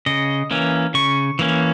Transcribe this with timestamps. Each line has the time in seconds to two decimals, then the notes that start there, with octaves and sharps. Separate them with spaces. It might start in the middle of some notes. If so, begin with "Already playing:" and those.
0.06 C#3 D#5
0.51 E3 A#3 C#4
0.94 C#3 C#6
1.39 E3 A#3 C#4